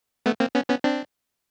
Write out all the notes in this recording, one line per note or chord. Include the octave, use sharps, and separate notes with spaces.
A3 B3
A#3 C4
B3 C#4
B3 C#4
C4 D4